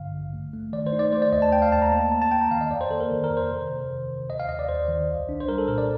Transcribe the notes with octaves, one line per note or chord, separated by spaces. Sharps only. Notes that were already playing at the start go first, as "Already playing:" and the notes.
Already playing: A1 G2 D3 F5
A1
A3
A3
D#3 D5
C5
D#4
D5
A3 C5
D5
D#2 D#5
A5
A3 G5
F5
D#2 A5
A#5
A#3 A5
A#3 A5
A5
A#3 G5
A#5
D#3 F5
D#5
F2 D5
C5
A#3 A4
A#4
D#3
A#4
F2
C5
C3
C3
D#3
D#3
D#2 D#5
F5
D#2 D#5
D5
D#2 C5
D#3
C2
D4
C5
G3 A#4
A4
A#2 A#4
D5